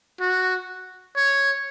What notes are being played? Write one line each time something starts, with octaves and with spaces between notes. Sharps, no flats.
F#4
C#5